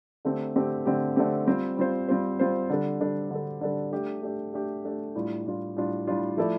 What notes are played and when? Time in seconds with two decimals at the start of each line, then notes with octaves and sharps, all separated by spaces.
0.25 D3 A3 C4 G4
0.56 D3 A3 C4 G4
0.85 D3 A3 C4 G4
1.16 D3 A3 C4 G4
1.46 G3 C4 F4 C5
1.77 G3 C4 F4 C5
2.08 G3 C4 F4 C5
2.39 G3 C4 F4 C5
2.70 D3 G3 D4 A4
3.01 D3 G3 D4 A4
3.31 D3 G3 D4 A4
3.61 D3 G3 D4 A4
3.92 A3 D4 G4
4.22 A3 D4 G4
4.54 A3 D4 G4
4.85 A3 D4 G4
5.15 A2 G3 D4 F4
5.46 A2 G3 D4 F4
5.76 A2 G3 D4 F4
6.07 A2 G3 D4 F4
6.37 F3 A3 E4 A4 D5